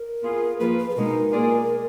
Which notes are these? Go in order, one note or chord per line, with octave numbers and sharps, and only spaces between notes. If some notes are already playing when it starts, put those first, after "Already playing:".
Already playing: A#4
B3 F4 G#4
F3 A#3 F4 G#4 B4
B4
G#4
B2 G#3 D#4 A#4
A#3 F4 G#4 D5